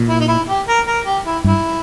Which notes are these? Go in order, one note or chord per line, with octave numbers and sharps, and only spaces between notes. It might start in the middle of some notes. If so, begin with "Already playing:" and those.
Already playing: A#2
E4
D#4
E4
G4
A#4
A#4
G4
E4
G2 E4